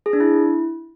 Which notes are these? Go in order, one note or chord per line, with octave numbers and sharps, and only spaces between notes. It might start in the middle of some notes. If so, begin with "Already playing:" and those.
G#4
D4
E4